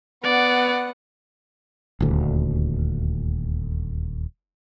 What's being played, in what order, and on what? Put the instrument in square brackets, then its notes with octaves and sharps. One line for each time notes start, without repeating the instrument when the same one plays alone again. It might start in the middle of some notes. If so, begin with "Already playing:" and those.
[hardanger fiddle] B3 F#5 [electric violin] D5
[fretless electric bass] D#1 D2